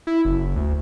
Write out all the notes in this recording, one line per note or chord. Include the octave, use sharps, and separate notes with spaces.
E4
F#1
D2